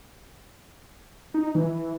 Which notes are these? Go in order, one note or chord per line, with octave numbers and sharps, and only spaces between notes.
D#4
E3